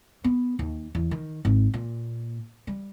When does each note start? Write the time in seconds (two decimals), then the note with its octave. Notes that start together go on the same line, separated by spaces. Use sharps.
0.24 B3
0.59 D#2
0.95 E2
1.11 D#3
1.45 G#1
1.74 A#2
2.67 G3